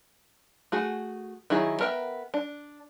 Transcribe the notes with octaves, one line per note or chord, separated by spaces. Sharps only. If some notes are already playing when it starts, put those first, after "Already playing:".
A3 F#4 G#4
D#3 F#3 E4 G#4
B3 A#4 E5 G5
D4